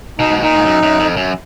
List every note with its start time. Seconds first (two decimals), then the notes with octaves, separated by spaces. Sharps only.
0.19 B2 D#4
0.31 G#2
0.42 A#2 D#4
0.55 G#2
0.65 F#2
0.83 F#2
1.00 F2
1.17 F#2